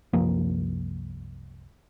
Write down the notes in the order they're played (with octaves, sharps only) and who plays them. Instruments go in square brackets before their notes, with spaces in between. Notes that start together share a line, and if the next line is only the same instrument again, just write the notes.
[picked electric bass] C2 F#2 F3 A#3